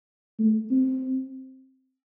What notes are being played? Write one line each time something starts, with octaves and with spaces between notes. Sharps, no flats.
A3
C4